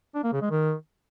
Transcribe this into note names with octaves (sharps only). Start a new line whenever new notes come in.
D4
A#3
C#3
G#3
D#3